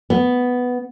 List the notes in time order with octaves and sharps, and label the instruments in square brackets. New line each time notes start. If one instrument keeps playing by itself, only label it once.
[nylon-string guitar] B3